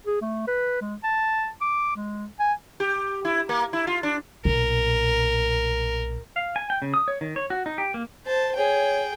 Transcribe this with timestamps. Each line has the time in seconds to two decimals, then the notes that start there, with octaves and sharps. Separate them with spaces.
0.07 G#4
0.21 A3
0.48 B4
0.81 G#3
1.04 A5
1.61 D6
1.96 G#3
2.40 G#5
2.80 G4
3.25 E4
3.49 A#3
3.73 E4
3.87 F4
4.03 D4
4.45 B1 A#2 A#4
6.36 F5
6.56 G#5
6.70 G5
6.82 C#3
6.94 D#6
7.08 C#5
7.21 D#3
7.36 C#5
7.50 F#4
7.66 D#4
7.78 G4
7.94 A#3
8.26 C5 A5
8.56 G#4 C#5 G5